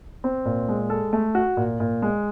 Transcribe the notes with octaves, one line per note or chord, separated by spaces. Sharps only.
C4
A#2
G#3
A4
A3
F#4
A#2
A#2
G#3